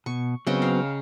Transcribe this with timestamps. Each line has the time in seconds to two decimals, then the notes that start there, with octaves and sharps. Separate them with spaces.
0.06 B2 C#6
0.47 C#3 F#3 B3 C4 D#5 G5
0.62 A#4 F5